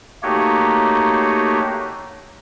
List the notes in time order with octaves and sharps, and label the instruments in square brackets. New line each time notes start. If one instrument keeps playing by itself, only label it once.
[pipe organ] A3 A#3 D#4 F#4 G4 C#5